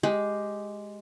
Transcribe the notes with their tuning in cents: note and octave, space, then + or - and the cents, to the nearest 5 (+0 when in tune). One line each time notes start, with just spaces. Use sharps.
G#3 +0 G4 +0